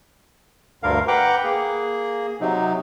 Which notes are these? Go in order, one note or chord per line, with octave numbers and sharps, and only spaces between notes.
D2 G2 D3 A#4 F5
B4 F#5 G5 A#5 D6
A#3 G#4
C3 F#3 D#4